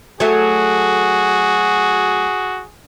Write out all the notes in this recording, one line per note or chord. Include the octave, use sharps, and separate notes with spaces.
F#3 A3 F#4 G#4